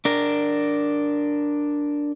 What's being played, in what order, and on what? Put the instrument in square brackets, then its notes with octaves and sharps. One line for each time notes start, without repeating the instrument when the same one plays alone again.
[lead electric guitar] D4 A#4